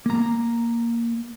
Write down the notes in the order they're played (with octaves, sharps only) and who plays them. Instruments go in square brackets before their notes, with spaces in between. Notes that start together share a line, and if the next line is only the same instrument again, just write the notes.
[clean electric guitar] A#3 A#5